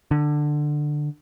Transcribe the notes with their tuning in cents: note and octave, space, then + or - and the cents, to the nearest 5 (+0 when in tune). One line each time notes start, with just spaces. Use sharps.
D3 +15